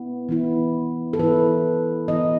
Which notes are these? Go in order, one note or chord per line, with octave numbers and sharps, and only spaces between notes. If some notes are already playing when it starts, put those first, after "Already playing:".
Already playing: B3 E4
E3 B3 E4
A4
E3 B3 E4 B4
E3 B3 E4 D#5